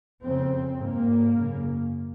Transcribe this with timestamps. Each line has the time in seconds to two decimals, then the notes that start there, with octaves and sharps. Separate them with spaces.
0.23 F2 C#3 C4
0.79 G#2 A#3
1.35 F#2 C#3